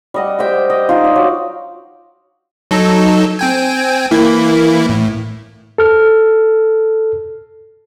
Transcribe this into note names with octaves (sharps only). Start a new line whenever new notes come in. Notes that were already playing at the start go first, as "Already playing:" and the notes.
G3 D#5 F#5
G4 C5 E5 G5
D#5
D#4 F4
D5
F#3
F#3 D#4 A4
C4 G5 G#5
E3 A#3 E4
A2
A4 F6